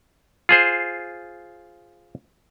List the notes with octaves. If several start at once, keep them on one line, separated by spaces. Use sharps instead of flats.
F4 G#4 C5